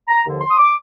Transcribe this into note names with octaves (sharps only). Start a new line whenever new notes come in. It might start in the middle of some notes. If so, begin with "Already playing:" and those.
A#5
D#2 D3 F3
C6
D#6
D6